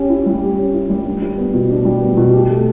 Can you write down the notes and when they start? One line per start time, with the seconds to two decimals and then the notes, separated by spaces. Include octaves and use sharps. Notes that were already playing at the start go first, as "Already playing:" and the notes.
Already playing: C#4 G4
0.09 E4
0.26 G3
0.41 G4
0.58 C#4
0.74 E4
0.90 G3
1.05 D4
1.22 G3
1.37 B3
1.54 B2
1.70 D4
1.85 G3
2.01 B3
2.17 B2
2.33 G4
2.49 A3